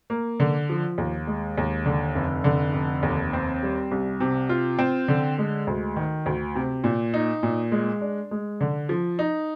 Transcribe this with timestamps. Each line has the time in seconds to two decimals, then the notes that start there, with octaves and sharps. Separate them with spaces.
0.10 A#3
0.40 D3
0.70 F3
0.98 D#2
1.27 G#3
1.58 D#2
1.86 D3
2.15 F1
2.44 D3
2.74 F1
3.03 D#2
3.33 C4
3.63 G3
3.91 C2
4.20 C3
4.49 F4
4.79 C4
5.08 D3
5.38 G#3
5.67 D2
5.96 D#3
6.26 D2
6.55 C3
6.84 A#2
7.14 D#4
7.43 A#2
7.72 G#3
8.01 D4
8.31 G#3
8.61 D3
8.89 F3
9.19 D#4